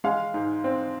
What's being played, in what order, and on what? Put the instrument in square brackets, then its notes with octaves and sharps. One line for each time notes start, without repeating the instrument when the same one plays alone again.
[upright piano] G#3 F5
G#2
C4